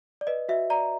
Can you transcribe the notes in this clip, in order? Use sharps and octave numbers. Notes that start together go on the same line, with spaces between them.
D5
B4 D#5
F#4 E5
D5 A#5